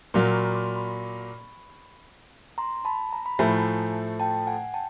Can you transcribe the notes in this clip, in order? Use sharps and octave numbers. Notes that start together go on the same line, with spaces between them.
A#2 F#3 A#3 A#5 C6
B5 C#6
C6 D6
B5 C#6
A#5 C6
A5 B5
A#5
B5
A2 F3 A3 G#5 A#5
G5 A5
F#5 G#5
G5 A5